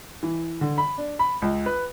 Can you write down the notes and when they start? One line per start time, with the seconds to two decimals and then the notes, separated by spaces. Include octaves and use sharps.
0.23 E3
0.61 D3
0.78 B5
0.98 D4
1.19 B5
1.42 C#2
1.66 B4